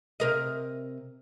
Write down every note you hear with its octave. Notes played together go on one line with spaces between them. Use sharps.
C3 A#4 D#5